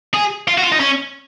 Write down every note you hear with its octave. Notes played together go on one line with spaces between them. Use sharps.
G#4
F4
F#4
F4
D#4
C#4